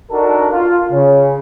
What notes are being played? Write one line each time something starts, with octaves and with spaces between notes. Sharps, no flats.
D4 D#4 F#4 A4 A#4
F4
C#3